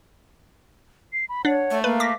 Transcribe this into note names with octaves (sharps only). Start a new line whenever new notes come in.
C7
B5
D4 C#5 F#5
A3
A#3 B4 F5
D6 A#6 B6